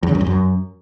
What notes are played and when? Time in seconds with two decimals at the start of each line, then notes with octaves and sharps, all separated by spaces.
0.03 E2
0.09 C#3
0.15 F#2
0.21 F2
0.27 F#2